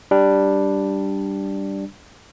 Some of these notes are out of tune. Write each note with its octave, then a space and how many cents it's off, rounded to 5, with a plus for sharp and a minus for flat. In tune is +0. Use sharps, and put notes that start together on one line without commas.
G3 +0 D4 +0